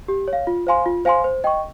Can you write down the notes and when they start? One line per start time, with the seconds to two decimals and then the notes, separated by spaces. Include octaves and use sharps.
0.08 G4
0.28 C#5
0.33 F5
0.47 F4
0.67 C5 F5 G#5 C6
0.86 F4
1.05 C5 F5 G#5 C6
1.24 C5
1.44 D#5 G5 C#6